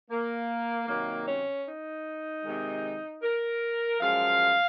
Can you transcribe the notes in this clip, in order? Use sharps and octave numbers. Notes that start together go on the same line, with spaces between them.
A#3
C3 D#3 F#3 A#3
C#4
D#4
C3 D#3 G#3
A#4
F#2 F3 G#3 F5